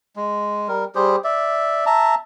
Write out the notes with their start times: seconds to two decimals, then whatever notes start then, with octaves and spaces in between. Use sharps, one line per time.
0.16 G#3
0.68 G3 A#4
0.95 G3 G4 G#4 C5
1.24 D5 E5
1.86 E5 A5 A#5